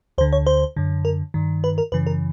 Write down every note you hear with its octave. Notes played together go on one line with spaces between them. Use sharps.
D2 D3 C5
C#5
C5
F#2 D3
A#4
G2 D#3
B4
A#4
F#2 C#3 E3 B4
A#4